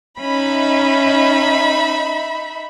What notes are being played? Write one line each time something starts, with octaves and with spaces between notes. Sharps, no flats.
C#4 D#4 E5 B5